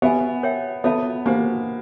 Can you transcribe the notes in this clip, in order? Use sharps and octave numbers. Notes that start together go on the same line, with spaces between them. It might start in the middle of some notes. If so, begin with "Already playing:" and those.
B3 G4 B4 E5 G#5
A#4 C#5 E5 G5
B3 F4 A4 C#5 E5 A5
A#3 D4 G4 C5